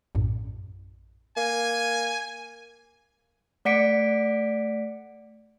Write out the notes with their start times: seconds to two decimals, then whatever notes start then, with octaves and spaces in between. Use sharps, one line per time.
0.15 A#1 F#2 A2
1.37 A#3 G#5
3.65 A3 D5 F#5 B6 C#7 D7